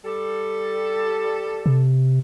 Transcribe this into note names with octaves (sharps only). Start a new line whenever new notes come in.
G3 A4
C3